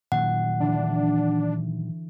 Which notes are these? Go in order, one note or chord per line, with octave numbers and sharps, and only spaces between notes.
A#2 D#3 F#3 F#5
D3 E3 D4